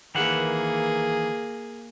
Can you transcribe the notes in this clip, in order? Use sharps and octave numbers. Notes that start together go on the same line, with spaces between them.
D#3 E3 A#3 G#4 F#5